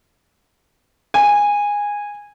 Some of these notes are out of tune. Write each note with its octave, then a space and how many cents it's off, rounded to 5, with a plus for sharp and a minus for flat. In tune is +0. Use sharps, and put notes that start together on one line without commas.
G#5 -15